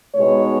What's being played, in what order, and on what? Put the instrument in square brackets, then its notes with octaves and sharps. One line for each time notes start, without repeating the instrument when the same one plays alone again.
[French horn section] B2 G#3 B3 D#4 C#5